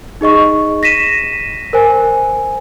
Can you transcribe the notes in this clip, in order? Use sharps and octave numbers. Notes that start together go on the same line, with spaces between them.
D#4 G#4 D#5 C#6
A#6 B6 D#7 E7
A#4 C5 G#5